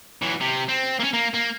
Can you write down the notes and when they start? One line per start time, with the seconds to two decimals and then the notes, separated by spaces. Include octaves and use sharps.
0.22 E3 F#3
0.41 C3
0.69 C4
1.00 A#3 C#4
1.14 A#3
1.34 A#3